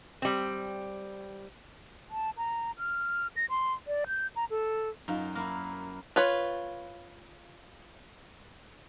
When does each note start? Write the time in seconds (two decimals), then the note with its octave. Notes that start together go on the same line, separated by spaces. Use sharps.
0.22 G3 C4
2.11 A5
2.38 A#5
2.78 F6
3.36 A#6
3.50 C6
3.87 D5
4.07 G6
4.36 A#5
4.50 A4
5.08 F#2 D#4 F4
5.35 A#3 E4 F6
6.16 F4 B4 C#5